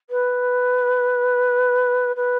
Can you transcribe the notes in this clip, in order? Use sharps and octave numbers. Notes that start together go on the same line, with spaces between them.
B4
B4